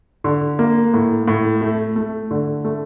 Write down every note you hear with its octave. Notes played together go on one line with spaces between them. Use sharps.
D3
A#3
A2
A2
A3
A3
D3
A3